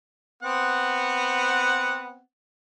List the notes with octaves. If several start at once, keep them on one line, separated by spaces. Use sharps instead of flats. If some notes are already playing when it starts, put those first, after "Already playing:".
B3 C4 F#5